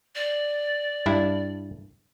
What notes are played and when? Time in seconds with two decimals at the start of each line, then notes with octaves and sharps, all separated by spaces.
0.15 D5
1.06 G2 D4 E4